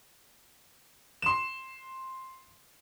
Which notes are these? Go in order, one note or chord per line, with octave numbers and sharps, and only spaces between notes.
C6 E7